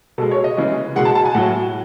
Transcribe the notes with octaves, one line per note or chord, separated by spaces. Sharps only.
B2 G#3 A4
C#5
D#5
C#3 E3 G#3
B2 G#3 F#5
A5
A5
G#5
A2 F#3 F#5